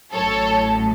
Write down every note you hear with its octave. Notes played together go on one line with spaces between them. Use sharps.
A1 A2 F#3 A4 C#5